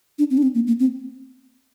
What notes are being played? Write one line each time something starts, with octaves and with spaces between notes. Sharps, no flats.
D4
C4
D4
C4
A#3
A#3
C4